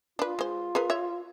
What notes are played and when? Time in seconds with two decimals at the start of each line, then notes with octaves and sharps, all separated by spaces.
0.19 D4 F4 B4
0.39 G#3 C5
0.75 G#4 A#4 B4
0.90 C#5 E5